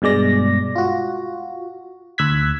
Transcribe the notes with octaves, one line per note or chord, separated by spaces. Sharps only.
G2 B2 G#3 D5 A#6
F4 F#4
D2 E6 F#6 G#6 B6